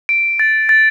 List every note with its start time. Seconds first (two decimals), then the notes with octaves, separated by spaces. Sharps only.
0.09 D7
0.39 A6
0.69 A6